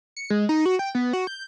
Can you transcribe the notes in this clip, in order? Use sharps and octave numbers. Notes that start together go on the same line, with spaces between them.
C#7
G#3
D#4
F#4
G5
B3
F#4
G6